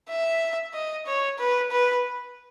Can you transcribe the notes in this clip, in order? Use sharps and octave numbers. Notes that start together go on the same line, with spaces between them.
E5
D#5
C#5
B4
B4